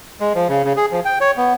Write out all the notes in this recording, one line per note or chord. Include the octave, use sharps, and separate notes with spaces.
G#3
F3
C#3
C#3
G#4
F3
G5
C#5
B3